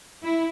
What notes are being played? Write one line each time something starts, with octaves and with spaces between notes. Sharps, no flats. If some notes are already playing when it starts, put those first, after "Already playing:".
E4